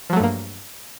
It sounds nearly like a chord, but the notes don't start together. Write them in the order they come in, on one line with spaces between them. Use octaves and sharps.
F3 F#3 A3 G2 A#3